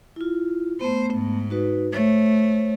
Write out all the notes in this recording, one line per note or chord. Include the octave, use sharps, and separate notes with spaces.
E4 F4
A3 B3 C5
G#2
D#4 F#4 B4
A3 C5 C#5